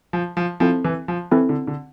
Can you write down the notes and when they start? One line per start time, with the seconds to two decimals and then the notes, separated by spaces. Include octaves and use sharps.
0.13 F3
0.37 F3
0.60 F3 C4 E4 A4
0.85 E3
1.08 F3
1.31 E3 C4 E4 A4
1.49 D3
1.67 D3